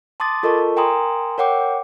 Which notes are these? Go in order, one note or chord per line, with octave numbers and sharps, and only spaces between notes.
A5 C6 D6 D#6 A6
F4 A4 A#4 D#5 A5 C#6
A#4 G5 G#5 A#5 C6 D#6
A#4 C#5 F#5 G5 D6